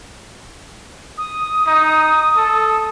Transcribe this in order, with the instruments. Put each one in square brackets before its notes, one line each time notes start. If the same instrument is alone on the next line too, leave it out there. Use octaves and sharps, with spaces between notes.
[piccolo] D#6
[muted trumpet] D#4
A4